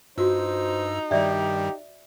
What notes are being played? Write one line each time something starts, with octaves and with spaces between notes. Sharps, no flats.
G2 D#4 F4 F#4 C5 E6
G2 D#3 G3 G4 D5 E5